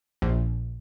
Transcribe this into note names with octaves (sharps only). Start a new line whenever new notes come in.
A#1